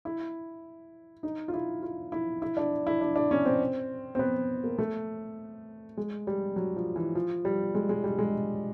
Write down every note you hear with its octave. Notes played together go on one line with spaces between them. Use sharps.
E4
D#4
F4
E4
F4
E4
E4
D4
E4
D4
D4
C#4
C4
C4
B3
A#3
A3
G#3
G3
F#3
F3
E3
F3
G3
G#3
G#3
G3
G#3